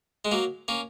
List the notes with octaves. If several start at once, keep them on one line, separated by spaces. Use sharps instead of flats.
G#3
F#3 A#3
A#3 C#4